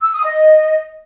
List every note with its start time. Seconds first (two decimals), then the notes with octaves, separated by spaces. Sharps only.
0.01 E6
0.12 D#6
0.24 D#5